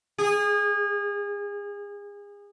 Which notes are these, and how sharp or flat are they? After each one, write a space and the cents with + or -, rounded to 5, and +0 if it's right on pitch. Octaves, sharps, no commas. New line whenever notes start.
G#4 -30